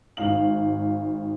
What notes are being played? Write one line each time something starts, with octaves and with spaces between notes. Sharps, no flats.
G#1 F5 F#7